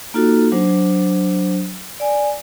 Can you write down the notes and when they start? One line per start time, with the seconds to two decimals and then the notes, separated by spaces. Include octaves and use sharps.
0.14 A#3 D#4 F4 F#4 A4
0.52 F#3 D4 C5
2.00 D5 G#5